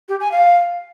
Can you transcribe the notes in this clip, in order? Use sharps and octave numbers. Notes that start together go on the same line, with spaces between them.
G4
G#5
F5